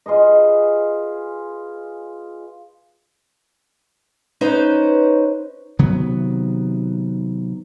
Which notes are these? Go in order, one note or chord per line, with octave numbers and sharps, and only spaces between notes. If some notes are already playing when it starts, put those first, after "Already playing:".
F4 G#4 B4 D#5
C#4 D#4 B4 C5
C3 D#3 F#3 B3